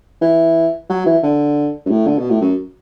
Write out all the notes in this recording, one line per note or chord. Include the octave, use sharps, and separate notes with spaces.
E3
F#3
E3
D3
F#2
A2
D3
B2
A2
F#2